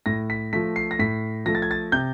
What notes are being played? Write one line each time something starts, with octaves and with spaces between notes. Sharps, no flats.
A2 A#6
B6
F3 A3 B6
C7
A#6
A2 B6
F3 A3 A#6
A6
G#6
A6
C3 G6